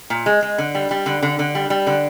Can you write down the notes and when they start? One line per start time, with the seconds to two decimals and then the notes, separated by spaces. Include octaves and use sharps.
0.10 A#2
0.26 G#3
0.42 G#3
0.58 D3
0.75 G3
0.91 G3
1.06 D3
1.22 D3
1.39 D3
1.55 G3
1.70 G3
1.87 D3